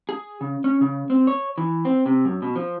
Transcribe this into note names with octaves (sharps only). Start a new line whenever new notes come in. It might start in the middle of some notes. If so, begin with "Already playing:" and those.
G#4
C#3
C#4
C#3
C4
C#5
E3
C4
C3
F#2
B2
F3